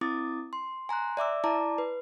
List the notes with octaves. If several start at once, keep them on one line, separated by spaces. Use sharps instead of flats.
C4 E4 D6 D#6 A6
C6
G#5 A#5 C6 F#6
D5 E5 D6 E6
E4 D5 A5 A#5 D6
B4